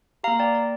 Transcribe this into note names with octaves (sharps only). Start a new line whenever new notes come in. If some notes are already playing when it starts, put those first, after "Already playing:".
A#3 G4 F5 A#5
D5 G5
D5